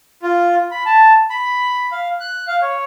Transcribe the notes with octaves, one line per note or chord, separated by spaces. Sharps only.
F4
B5
A5
B5
F5
F#6
F5
C#5